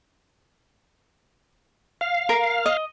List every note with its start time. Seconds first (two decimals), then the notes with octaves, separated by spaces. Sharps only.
2.01 F5
2.29 A#4
2.66 D#5